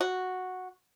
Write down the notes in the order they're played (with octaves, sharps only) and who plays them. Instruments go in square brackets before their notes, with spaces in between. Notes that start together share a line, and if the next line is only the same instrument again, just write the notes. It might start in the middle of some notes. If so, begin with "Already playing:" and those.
[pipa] F#4